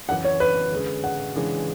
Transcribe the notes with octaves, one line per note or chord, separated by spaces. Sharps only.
F#2 C#3 E3 F#5
C#5
B4
D3 G#3 C#4 G#4 B4
F#5
C#3 E3 G#3 D4